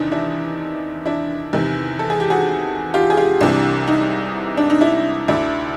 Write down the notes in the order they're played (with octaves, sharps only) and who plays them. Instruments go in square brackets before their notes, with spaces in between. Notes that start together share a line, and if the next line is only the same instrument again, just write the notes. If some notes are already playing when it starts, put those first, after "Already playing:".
Already playing: [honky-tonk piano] E2 C3 D#3 D4 D#4
D4 E4
D4 E4
E2 C3 D#3
A4
G#4
G4
F#4 G#4
F4 G4
G#4
F4 G4
C2 C3 E3 D4
D#4
D4
D#4
D4 E4
D2 D3 D4 E4